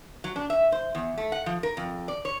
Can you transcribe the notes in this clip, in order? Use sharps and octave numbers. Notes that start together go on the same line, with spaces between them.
F#3
D4
E5
C5
E2
A3
F#5
F3
A#4
F2
D5
C#5